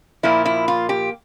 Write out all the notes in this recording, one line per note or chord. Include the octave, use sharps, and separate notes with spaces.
A#2 F3 A#3 E4
E4
F4
G4